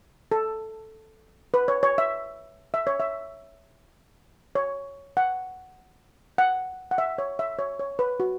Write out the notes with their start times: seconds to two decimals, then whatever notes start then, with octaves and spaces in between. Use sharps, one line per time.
0.32 A4
1.54 B4
1.68 C#5
1.83 C#5
1.98 E5
2.74 E5
2.87 C#5
3.00 E5
4.55 C#5
5.17 F#5
6.38 F#5
6.91 F#5
6.98 E5
7.18 C#5
7.39 E5
7.59 C#5
7.79 C#5
7.99 B4
8.20 F#4